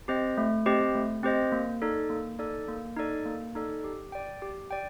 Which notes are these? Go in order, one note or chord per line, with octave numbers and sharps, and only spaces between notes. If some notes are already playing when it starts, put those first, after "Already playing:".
C4 G4 C5 D#5
A3
C4 G4 C5 D#5
A3
C4 G4 C5 D#5
A#3
D#4 A4 D5
A#3
D#4 A4 D5
A#3
D#4 A4 D5
A#3
D#4 A4 D5
G4
D5 G5
G4
D5 G5